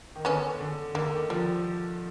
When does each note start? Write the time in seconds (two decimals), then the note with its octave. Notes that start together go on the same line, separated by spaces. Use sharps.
0.16 D#3
0.25 D3 B3 C#4
0.60 D3
0.95 D3 A#3
1.13 D#3
1.30 F3 G3